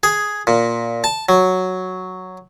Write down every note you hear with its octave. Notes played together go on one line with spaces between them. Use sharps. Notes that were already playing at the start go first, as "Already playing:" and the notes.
G#4
A#2
A5
F#3